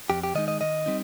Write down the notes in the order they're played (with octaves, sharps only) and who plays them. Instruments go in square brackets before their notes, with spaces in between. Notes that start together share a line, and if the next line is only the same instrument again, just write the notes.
[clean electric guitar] F2 G4
G4
D#3 G#3 D#4 D#5
D#5
D#3 D#5
G3 C4 D#4